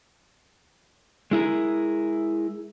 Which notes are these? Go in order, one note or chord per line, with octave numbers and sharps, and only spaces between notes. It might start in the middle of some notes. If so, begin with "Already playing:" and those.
G#3 E4 G#4 A#4